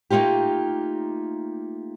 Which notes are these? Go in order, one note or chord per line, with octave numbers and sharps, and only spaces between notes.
A3 A#3 D#4 F4 G4